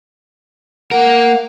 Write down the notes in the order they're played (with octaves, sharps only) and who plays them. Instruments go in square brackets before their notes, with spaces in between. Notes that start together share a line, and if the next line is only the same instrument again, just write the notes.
[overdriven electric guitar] A#3 A#4 [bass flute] F#5